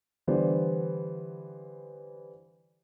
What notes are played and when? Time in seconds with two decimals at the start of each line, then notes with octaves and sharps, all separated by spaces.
0.27 D3 E3 G3 B3 C5 D5